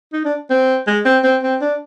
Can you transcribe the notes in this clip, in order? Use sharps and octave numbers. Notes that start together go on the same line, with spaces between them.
D#4
D4
C4
G#3
C4
C4
C4
D4